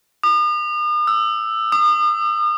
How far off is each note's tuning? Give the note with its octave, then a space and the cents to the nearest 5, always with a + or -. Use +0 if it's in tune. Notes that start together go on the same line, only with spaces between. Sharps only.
D#6 -45
E6 +5
D#6 -35